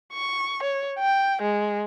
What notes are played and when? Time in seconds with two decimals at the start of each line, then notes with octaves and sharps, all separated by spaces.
0.13 C#6
0.63 C#5
0.99 G5
1.42 G#3